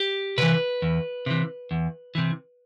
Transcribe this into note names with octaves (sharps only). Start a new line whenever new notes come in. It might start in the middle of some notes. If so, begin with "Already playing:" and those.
Already playing: G4
C3 E3 B4
E2
C3 E3
E2
C3 E3